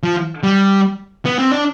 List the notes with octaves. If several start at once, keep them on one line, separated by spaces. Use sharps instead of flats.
F3
G3
B3
C4
D4